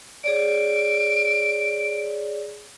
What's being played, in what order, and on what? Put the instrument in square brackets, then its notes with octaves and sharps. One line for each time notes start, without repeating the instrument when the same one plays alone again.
[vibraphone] G#4 C#5 D5 [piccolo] D7